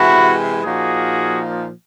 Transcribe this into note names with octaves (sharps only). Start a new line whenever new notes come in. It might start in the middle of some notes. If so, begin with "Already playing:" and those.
Already playing: C3 E3 G#3 E4 F#4
A#2 F3 A#3 D#4 F#4 G#4